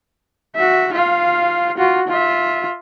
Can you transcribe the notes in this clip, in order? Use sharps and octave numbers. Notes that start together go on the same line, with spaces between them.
F#4 E5
F4 F5
F4 F#4
F4 E5